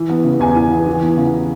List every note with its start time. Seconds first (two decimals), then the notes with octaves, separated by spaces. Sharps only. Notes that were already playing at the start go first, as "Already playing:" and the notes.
Already playing: E3
0.10 B3
0.24 C#3
0.40 E2 G#5
0.55 E3
0.71 B3
0.87 E3
1.02 B3
1.17 C#3